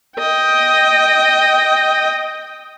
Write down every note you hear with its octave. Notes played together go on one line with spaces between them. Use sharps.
D#5 G5